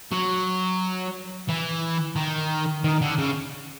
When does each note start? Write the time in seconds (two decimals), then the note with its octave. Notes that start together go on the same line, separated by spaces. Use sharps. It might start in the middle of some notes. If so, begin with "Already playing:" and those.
0.12 F#3
1.49 E3
2.16 D#3
2.84 D#3
3.01 D3
3.18 C#3